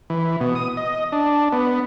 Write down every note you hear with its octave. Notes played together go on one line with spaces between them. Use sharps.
E3
B2
D#6
D#5
D4
B3